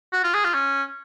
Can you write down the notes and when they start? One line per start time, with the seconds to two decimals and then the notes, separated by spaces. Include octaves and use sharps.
0.13 F#4
0.24 F4
0.34 G#4
0.44 F4
0.54 C#4